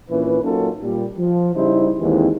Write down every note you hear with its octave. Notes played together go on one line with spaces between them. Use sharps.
A#1 A#2 E3 C#4 B4
F#3 A#3 C#4 D#4 F4 A4
A#2 G3
F3
C#3 G3 D#4 E4 C5
D#2 E3 G#3 C4